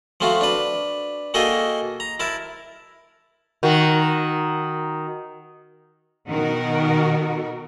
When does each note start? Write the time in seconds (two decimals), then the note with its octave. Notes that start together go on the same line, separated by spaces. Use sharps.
0.21 F3 A3 C4 F4 F#4
0.41 D4 B4
1.34 A#3 F#4 G#4 A4 D#5 G5
2.00 A#5
2.20 E4 A#4 A5
3.63 D#3 F#4
6.29 B2 D#3 F#4 A#4